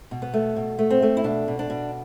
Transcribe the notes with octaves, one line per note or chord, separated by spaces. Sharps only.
B2
B3
A3
B2
A3
C4
A3
E4
B2 D4
B2
D4
B2